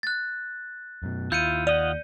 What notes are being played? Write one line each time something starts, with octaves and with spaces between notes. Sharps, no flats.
F#6 A6
F#2 B2
D#2 E4 F4 G6 C#7 D#7
F4 D5 D#5 F#5